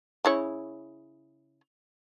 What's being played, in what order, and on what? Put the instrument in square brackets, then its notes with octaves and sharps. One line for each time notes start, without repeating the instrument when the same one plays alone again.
[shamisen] C#3 E4 C#5